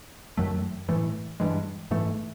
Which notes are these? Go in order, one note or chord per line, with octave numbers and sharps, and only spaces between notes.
F#2 D#3 F#3 A3
A2 E3 A3
G2 E3 G#3
G#2 E3 A3